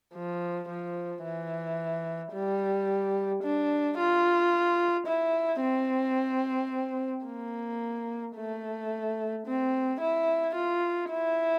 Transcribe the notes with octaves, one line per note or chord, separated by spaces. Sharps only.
F3
F3
E3
G3
D4
F4
E4
C4
A#3
A3
C4
E4
F4
E4